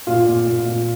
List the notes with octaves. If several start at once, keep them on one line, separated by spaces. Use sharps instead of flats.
A#2 F4
A#2
A#2
A#2